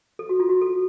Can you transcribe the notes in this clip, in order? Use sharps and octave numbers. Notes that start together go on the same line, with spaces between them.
A4
F#4
F4
F#4
A4